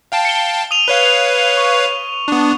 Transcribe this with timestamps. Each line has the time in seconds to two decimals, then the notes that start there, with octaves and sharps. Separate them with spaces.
0.12 F5 G5 A5
0.25 C#7 G7
0.71 D#6 D#7 F7
0.88 B4 C#5 F5
1.57 C#6
2.28 B3 D4